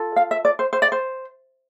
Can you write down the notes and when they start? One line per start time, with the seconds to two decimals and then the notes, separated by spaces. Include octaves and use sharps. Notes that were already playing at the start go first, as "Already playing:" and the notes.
Already playing: F4 A4
0.16 F5
0.31 E5
0.45 D5
0.59 C5
0.73 C5
0.82 D5
0.92 C5